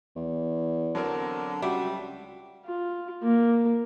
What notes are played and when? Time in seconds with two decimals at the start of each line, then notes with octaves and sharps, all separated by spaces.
0.16 E2
0.95 D3 F#3 C4 A#4
1.62 C#2 F#3 G3 E5
2.66 F4
3.22 A#3